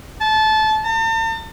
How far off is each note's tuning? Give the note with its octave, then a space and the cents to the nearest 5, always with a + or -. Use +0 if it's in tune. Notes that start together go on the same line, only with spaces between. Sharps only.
A5 -20
A5 +45